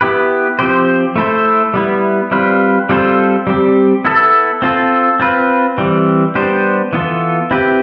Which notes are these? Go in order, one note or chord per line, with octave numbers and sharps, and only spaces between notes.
B3 E4 G4 B4
F3 C4 G4 C5
A3 E4 A4 C5
G3 B3 E4
G3 C4 F4 B4
G3 C4 F4 A4 C5
G3 C4 G4
B3 E4 A4
C4 F4 A4
C4 F4 B4
E3 G3 C4
G3 B3 D4 G4 C5
E3 B3 F4 A4
C4 E4 G4 B4